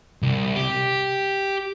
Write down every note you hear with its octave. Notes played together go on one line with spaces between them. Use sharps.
C2
G4